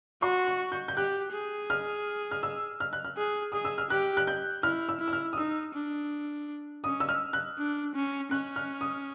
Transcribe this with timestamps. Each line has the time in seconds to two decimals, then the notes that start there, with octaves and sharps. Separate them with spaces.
0.22 F#4 C6
0.48 C#6
0.72 G6
0.88 G6
0.96 G4 F#6
1.33 G#4
1.70 F6
2.31 F6
2.43 E6
2.80 F6
2.93 F#6
3.05 F6
3.17 G#4
3.52 G#4 D#6
3.65 E6
3.78 F6
3.90 G4 F#6
4.17 F#6
4.27 G6
4.63 E4 F6
4.89 E6
5.00 E4
5.08 E6
5.13 F6
5.33 D#6
5.37 D#4 E6
5.74 D4
6.84 C#4 D#6
7.00 E6
7.09 F6
7.33 F#6
7.58 D4
7.95 C#4
8.31 C#4 F#6
8.56 F6
8.81 D#6